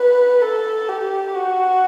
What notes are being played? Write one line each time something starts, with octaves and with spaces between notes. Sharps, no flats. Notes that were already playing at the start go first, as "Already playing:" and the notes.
Already playing: B4
A4
G4
F#4